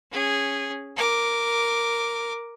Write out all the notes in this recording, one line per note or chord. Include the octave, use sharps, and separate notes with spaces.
C#4 G#4
A#4 D6